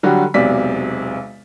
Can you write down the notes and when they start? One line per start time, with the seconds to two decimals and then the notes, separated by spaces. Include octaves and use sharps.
0.03 D3 F#3 G3 F#4 G4
0.34 E1 B1 C3 D5 B6